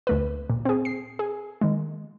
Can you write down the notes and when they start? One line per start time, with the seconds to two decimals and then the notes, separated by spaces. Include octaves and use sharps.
0.07 D2 A3 B4
0.50 A#2
0.65 C4 G#4
0.85 C7
1.19 G#4
1.61 D#3 G#3